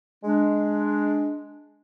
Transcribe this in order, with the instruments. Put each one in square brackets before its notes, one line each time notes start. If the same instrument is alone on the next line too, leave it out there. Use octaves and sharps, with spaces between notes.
[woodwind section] G#3 D4